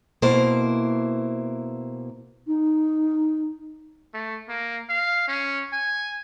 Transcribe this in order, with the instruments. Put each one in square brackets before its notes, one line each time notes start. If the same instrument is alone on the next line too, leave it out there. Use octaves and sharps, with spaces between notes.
[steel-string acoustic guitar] B2 A#3 E4 C5
[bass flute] D#4
[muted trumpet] A3
A#3
F5
C#4
G#5